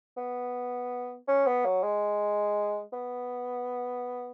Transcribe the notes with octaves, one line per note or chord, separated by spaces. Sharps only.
B3
C#4
B3
F#3
G#3
B3